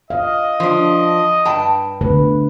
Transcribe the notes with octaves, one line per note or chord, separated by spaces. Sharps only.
D#5 F5
F3 D4
G2 G5 A5
D3 A3 B4